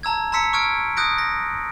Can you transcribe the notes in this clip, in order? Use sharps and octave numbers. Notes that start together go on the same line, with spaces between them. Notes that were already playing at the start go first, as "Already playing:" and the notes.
A5 A#5 E6 G#6
A5 A#5 C6 E6 B6 C#7
C#6 E6 F6 G#6 D7
D#6 F#6 G6 A#6 D7
A#6